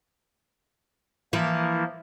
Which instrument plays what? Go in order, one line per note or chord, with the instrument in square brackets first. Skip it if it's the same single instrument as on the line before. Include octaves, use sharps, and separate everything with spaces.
[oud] E3 [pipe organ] F3 A#3